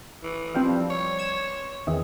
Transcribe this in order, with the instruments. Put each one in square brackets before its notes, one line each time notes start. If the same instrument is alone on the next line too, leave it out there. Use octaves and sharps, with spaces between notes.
[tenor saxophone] E3
[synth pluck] F3 G3 C4
[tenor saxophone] C#5
[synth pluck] G#6 E7
E2 D#3 E3